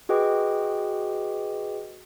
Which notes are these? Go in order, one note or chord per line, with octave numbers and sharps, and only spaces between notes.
F#4 G#4 B4 D#5 G5 D6